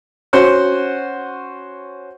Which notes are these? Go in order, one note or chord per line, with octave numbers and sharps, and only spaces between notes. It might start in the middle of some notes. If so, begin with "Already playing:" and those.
C#4 F#4 C5 F#5